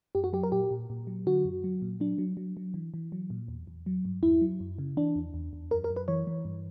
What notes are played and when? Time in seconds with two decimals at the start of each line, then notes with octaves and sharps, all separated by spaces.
0.15 F#2 G4
0.24 F#4
0.33 F#3 G4
0.43 A#4
0.52 A#2 G4
0.71 A#2
0.90 A#2
1.07 F#3
1.27 D3 F#4
1.45 F#2
1.64 F#3
1.82 A#2
2.00 F#3 D4
2.18 F#3
2.37 F#3
2.57 F#3
2.74 E3
2.94 E3
3.12 F#3
3.30 A#2
3.48 E2
3.67 E2
3.86 F#3
4.05 G2
4.23 E2 E4
4.41 F#3
4.60 F#2
4.78 C#3
4.97 E3 D4
5.16 E2
5.34 E2
5.53 E2
5.71 F#2 A#4
5.84 A#4
5.90 F#2
5.96 B4
6.08 E3 C#5
6.27 E3
6.45 G2